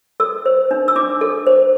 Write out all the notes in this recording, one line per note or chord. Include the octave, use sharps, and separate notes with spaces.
A4 E6
C5
D4
E6
D4 D6
A4
C5